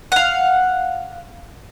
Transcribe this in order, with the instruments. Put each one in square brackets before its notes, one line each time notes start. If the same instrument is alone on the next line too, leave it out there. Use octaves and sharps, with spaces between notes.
[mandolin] F5 F#5